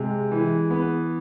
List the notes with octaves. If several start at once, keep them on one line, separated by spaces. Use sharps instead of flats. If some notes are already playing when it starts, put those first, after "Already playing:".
Already playing: C3 G#3
E3
B3